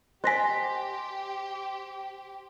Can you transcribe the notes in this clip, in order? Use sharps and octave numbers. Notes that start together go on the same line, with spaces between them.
G4 C5 D#5 G#5 F#6 A#6 B6